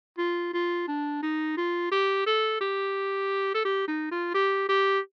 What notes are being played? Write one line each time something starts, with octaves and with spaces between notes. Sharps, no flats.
F4
F4
D4
D#4
F4
G4
A4
G4
A4
G4
D#4
F4
G4
G4